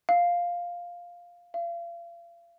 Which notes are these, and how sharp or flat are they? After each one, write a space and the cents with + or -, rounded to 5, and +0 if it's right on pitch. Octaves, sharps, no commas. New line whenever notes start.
F5 +5
F5 -35